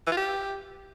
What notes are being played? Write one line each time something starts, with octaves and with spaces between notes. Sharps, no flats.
E3
F4
G4